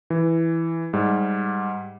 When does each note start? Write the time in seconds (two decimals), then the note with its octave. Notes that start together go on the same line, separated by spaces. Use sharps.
0.10 E3
0.93 G#2 G3